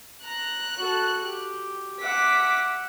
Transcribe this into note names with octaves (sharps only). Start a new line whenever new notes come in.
A#5 F#6
F#4 A4
G4
E5 F#5 D6 B6